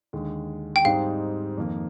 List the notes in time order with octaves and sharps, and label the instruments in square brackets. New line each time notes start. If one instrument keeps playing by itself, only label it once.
[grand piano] D#2 D3 G#3
[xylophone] G5
[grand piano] G#2 G3 C4 D#4 [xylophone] F5
[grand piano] F2 D#3 A#3